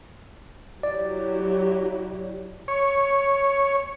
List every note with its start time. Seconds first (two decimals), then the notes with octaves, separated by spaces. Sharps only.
0.83 F#3 E4 G4 D5
2.68 C#5